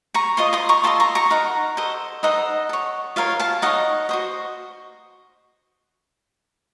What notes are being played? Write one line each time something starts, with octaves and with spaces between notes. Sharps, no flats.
A#5 C#6
F4 C5 D#5 C6 D#6
C6 D#6
A#5 C#6
F4 A4 D#5 A5 C6
A#5 C#6
A#5 C#6
D#4 F#4 A#4 F#5 A#5
A4 C5 D#5
D#4 A4 C5 D#5 F#5
A4 C#5
F4 A#4 C#5 F5
F5 A5
D#4 A4 C#5 D#5 F#5
F#4 C5 D#5